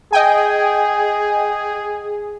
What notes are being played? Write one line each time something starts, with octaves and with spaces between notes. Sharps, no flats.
G#4 D#5 G5 G#5